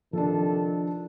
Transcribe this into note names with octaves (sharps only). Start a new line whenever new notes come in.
C3 D#3 F3 D4 A4